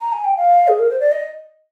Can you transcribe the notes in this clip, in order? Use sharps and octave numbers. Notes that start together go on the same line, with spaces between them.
A#5
G#5
G5
F5
G#4
A#4
C5
D5
D#5